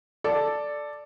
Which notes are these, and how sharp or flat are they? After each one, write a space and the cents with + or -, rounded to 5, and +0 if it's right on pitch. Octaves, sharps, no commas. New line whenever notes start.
A4 +0 D5 +0